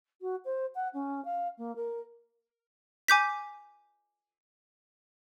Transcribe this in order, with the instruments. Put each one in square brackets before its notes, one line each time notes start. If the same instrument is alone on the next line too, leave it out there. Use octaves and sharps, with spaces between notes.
[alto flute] F#4
C5
F#5
C#4
F5
A#3
A#4
[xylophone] G#5 D6 G6 B6